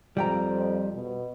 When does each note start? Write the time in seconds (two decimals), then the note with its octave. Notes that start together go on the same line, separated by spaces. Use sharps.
0.17 F2 G3 G5 A#5
0.95 B2